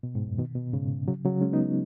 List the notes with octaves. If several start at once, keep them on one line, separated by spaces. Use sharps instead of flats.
B2
G#2
F#2
B2 D#3
B2
G#2 C#3
C#3 F#3
C#3 F#3
G#3 C#4
B3 D#4